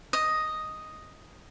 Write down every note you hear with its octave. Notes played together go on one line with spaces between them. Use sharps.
D#5